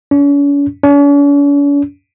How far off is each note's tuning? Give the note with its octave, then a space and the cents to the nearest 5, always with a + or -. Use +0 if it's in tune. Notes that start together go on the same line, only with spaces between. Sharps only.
C#4 +40
C#4 +45